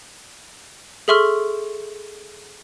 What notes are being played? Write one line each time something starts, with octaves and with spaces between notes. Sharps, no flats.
G#4 A4 E5 C6 C#6 F6